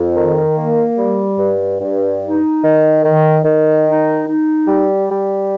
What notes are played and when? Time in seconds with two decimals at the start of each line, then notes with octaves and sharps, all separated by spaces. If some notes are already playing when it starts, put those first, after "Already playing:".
Already playing: F2
0.16 D#3
0.57 A#3
0.98 G3
1.39 G2
1.81 G2
2.22 D#4
2.63 D#3
3.04 D#3
3.44 D#3
3.85 D#4
4.27 D#4
4.68 G3
5.10 G3